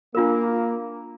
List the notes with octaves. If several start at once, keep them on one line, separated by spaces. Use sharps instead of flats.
A#3 D4 F4 A#4